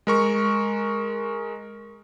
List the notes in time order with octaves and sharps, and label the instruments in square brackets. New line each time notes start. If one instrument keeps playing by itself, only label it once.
[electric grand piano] G#3 A#4 C#6